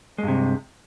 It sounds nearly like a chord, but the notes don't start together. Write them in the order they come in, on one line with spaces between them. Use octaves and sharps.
G#3 G2 C3